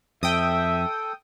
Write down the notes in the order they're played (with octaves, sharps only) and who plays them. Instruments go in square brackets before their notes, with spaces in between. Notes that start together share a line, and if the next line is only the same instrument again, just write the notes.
[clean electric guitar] F2 [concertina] A4 [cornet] E5 [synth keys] G5 D#6